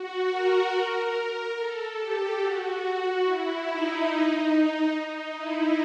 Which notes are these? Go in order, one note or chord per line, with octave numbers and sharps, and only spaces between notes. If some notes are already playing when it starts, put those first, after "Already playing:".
Already playing: F#4
A#4
A#4
A4
G4
F#4
F#4
E4
D#4
D#4
E4